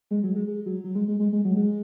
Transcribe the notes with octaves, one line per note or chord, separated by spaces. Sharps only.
G#3
F#3
G#3
G#3
F#3
F#3
G#3
G#3
G#3
G#3
F#3
G#3